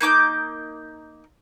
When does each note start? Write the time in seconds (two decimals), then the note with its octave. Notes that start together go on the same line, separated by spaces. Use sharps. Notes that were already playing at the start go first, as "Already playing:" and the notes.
0.01 A#3 D#4 D6 G6